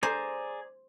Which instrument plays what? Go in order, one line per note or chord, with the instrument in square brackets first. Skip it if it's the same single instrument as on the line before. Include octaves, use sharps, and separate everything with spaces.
[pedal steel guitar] G#4 D5 A#5 [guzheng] C5